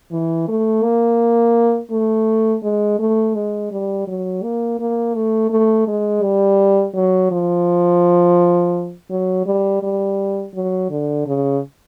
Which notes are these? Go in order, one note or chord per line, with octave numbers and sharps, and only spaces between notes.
E3
A3
A#3
A3
G#3
A3
G#3
G3
F#3
A#3
A#3
A3
A3
G#3
G3
F#3
F3
F#3
G3
G3
F#3
D3
C#3